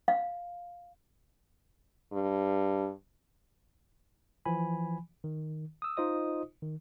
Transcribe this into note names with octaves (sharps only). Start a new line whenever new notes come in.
F5
G2
E3 F3 G#5 B5
D#3
D#6 E6
D#4 F4 C5 D#5 D#6
D#3